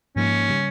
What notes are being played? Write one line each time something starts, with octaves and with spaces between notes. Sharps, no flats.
G#2 F3 A#3 C#4 D#4
C#3 G3